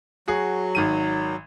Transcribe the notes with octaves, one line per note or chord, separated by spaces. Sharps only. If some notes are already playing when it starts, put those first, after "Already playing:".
F#3 F#4 G#4
G#1 D#3 D#7